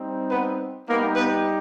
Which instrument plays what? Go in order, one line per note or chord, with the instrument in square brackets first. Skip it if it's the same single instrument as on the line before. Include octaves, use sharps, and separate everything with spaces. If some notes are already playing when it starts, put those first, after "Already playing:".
Already playing: [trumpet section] G3 C4 D#4
B3 B4
G3 A#3 B3 D#4 G4 A#4
B3 B4